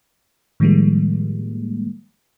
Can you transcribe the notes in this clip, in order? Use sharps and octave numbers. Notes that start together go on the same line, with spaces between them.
A2 D#3 F3 G3 G#3 A#3